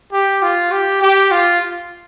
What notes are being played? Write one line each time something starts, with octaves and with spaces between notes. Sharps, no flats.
G4
F4
G4
G4
F4